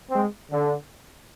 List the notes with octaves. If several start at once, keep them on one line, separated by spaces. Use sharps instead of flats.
G#3 C4
D3